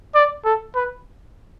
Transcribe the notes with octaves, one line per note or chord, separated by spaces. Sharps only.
D5
A4
B4